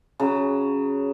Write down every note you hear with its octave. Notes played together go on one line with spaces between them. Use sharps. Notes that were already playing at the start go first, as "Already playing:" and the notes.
C#3 F#3